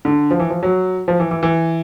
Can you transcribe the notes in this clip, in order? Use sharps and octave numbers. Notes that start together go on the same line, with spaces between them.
D3
F3
E3
F3
F#3
F3
E3
E3
E3